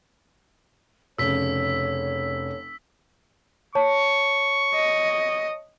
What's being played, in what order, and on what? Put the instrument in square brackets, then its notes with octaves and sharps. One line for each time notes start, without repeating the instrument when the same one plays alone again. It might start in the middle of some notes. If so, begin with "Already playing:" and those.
[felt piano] F1 C#3 [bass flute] C#5 [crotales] E6 B6
[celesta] C#5 A5 [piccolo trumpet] C#6
[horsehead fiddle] D#5